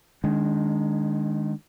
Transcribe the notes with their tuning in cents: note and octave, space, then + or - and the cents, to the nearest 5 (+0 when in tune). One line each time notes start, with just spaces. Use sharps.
D#3 -20 G#3 +0 D4 -40